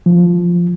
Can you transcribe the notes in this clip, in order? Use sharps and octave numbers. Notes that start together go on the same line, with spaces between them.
F3